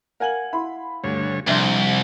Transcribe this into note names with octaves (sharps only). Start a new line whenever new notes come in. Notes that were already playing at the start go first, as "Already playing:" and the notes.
A#4 F5 F#5 G#5 F#7
E4 B5 C6
D2 G2 D3 C#5
C2 F2 C3 F3 G3 D4 E5 C6